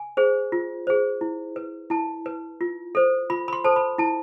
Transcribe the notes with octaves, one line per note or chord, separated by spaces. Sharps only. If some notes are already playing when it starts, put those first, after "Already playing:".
Already playing: G#5
G#4 C5
F4
G#4 C5
E4
B4
E4 A5
B4
F4
A4 C5
F4 B5
B5
C6
A4 C5 A5
B5
E4 A5